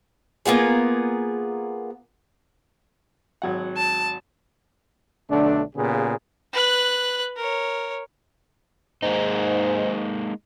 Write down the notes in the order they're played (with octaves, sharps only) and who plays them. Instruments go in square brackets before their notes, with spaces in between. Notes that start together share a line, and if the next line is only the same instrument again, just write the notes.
[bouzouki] A#3 B3 F4 G#4
[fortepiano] G#1 F#3 F#5
[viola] A5
[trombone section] B1 D3 A3 D4
A#2 C#3 B3 G4 G#4
[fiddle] B4 F#6
A#4 C#5
[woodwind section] G#2 [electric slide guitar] G#3 A#3 D#4